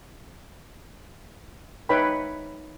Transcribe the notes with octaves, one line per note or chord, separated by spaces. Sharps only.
D#4 B4 C#5 E5 G5 B5